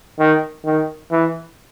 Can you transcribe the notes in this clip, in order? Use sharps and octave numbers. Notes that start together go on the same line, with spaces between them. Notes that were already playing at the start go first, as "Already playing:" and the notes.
D#3
D#3
E3